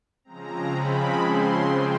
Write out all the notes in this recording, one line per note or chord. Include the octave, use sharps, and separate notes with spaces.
C#3 F3 G#3 C4 A#5
B5
C6
G5